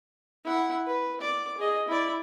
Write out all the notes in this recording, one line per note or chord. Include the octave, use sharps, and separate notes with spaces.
E4 F#5
B4
D5 D6
G#4 D#5
E4 D5